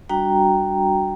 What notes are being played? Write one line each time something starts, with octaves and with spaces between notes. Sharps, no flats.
G3 D4 F#4 G5 A#5